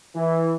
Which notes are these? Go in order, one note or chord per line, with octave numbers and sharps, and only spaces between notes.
E3